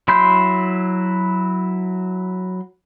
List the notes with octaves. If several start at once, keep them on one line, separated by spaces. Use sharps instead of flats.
F#3 E4 B5 C6 G6